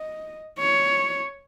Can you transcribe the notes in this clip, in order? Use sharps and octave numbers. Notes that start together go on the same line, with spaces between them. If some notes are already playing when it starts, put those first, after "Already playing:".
Already playing: D#5
C#5